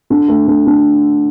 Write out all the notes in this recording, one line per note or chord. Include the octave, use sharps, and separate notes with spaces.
D3
A3
D3
D3